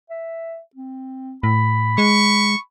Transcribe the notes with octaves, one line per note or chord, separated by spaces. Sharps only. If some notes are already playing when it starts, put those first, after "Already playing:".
E5
C4
A2 B5
G#3 C#6